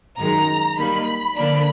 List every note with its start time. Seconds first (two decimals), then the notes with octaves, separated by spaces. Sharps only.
0.18 F#2 D#3 G#3 A#5
0.76 D#3 G3 A#3 D#4 B5
1.36 D3 F3 A#3 D4 B5